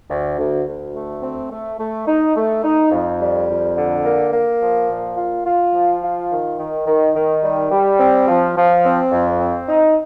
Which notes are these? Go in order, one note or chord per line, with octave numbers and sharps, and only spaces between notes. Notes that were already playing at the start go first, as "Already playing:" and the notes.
D2
D2
D2
A3
C4
A3
A3
D#4
A3
D#4
F2
G3
F2
D3
A#3
A#3
F3
A#2
F4
F4
F3
F4
D#3
D#3
D#3
D#3
G3
G3
C4
F3
F3
C4
F2
C4
D#4